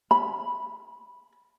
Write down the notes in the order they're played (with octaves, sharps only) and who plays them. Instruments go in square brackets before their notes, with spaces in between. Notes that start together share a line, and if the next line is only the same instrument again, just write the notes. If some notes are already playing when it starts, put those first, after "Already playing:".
[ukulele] B5